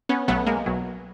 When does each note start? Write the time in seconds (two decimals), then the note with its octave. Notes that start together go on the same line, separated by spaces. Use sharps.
0.09 B3 C#4
0.28 B1 B2 F#3 A3 B3
0.46 G#3 A#3
0.66 B1 B2 F#3